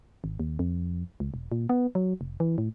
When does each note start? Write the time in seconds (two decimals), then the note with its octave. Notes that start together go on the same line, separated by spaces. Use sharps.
0.24 G#1
0.40 D#2
0.59 F2
1.20 C#2
1.34 E1
1.52 A#2
1.69 B3
1.95 F#3
2.21 F1
2.40 E3
2.58 A2